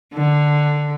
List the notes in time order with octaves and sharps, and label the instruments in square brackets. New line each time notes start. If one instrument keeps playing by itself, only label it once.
[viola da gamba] D3